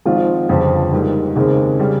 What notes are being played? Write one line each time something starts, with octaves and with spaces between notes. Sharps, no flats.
G#1 G#2 F3 C4 F4
G1 F2 C#3 F3
G#2 G3 A#3
D#2 C#3 G#3 C4
C#3 G3